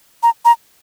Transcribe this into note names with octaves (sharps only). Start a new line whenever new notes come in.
A#5
A#5